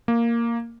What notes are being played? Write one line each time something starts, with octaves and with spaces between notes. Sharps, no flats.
A#3